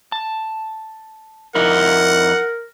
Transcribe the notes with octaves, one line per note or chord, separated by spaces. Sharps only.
A5
F2 D#4 E4 A#4 F#5